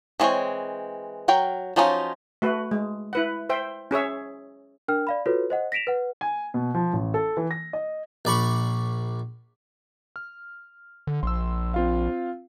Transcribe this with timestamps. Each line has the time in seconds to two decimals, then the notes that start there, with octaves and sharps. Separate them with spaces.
0.20 D#3 E3 G#3 C4 C#5
1.28 F#3 A#4 G5
1.76 F3 F#3 C#4 D#4 F4
2.42 A3 F#4 B4
2.71 G#3
3.13 E4 B4 F#5
3.50 C5 E5 G5
3.91 C#4 G#4 C#5 E5
4.88 D4 A#4 G5 F6
5.07 D5 F5 B5
5.26 F4 F#4 A4 B4 C#5
5.50 C5 D#5 F#5
5.72 A#6 B6 D7 E7 F7
5.87 B4 F#5
6.21 G#5
6.54 B2
6.74 F3
6.93 A1
7.14 A4
7.37 E3
7.51 A#6
7.73 D#5
8.25 A#1 D5 B5 C#6
10.16 F6
11.07 D3
11.23 A#1 C6 E6
11.74 C4 F4 F5